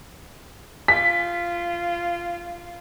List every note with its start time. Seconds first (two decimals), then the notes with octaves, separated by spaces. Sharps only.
0.88 F4 B6